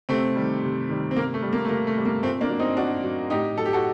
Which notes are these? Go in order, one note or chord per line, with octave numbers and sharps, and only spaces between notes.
C3 A3 C4
D#3 G3
C3
D#3 G3
C4
C3 A#3
A3
G3
A#3
A3
C3 A#3
A3
G3
A#3
A#2 A3 C4
A#3 D4
F#3
C4 D#4
A#2 D4 F#4
F#3
A2 D#4 G4
F#3 A4
G4
F#4 A4